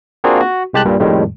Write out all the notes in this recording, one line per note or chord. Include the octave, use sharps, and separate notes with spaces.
A#3 C4 D4 F4 F#4 G#4
F#4
C2 G#3 G4 A5 F#6
G2 A#2 G3
F2 A2 D#3 G3 G#3